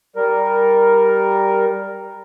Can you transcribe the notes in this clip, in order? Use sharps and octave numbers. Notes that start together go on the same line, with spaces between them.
G3 A#4